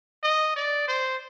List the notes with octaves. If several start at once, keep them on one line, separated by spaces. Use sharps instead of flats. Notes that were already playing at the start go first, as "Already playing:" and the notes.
D#5
D5
C5